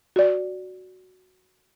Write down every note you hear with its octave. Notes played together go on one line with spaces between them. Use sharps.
F#4 D5